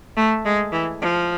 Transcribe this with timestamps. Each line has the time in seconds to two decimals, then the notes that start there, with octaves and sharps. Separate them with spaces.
0.17 A3
0.45 G#3
0.72 E3
1.01 F3